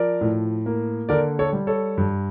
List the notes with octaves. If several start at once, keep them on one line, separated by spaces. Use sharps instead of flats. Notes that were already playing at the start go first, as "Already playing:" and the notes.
Already playing: F3 A#4 D5
A2
A#3
D3 A#4 D5
A4 C#5
G3
A4 C#5
G2